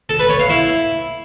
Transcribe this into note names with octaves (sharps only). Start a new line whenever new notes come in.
A4
B4
C#5
F5
E4